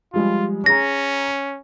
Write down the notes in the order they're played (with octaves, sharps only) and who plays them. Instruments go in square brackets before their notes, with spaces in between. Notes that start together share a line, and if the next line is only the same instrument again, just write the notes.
[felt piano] F3 G3 G#3 [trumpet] F4
[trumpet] C#4 [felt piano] G#4 A#5 [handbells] A#6